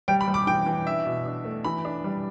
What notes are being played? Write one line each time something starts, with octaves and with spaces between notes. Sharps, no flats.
G3 G5
B5
G3
D6
E3 G5
E3
D4 E5
B2
D4
A3
E3 B5
D4
G3